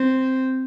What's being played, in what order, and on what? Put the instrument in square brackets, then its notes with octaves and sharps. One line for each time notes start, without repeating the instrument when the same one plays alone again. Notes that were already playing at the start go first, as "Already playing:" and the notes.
Already playing: [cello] C4